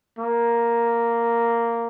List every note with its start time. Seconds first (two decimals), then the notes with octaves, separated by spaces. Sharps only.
0.19 A#3